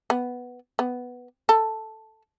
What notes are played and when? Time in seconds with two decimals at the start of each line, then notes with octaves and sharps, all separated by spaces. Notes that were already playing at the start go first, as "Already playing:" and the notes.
0.10 B3
0.79 B3
1.49 A4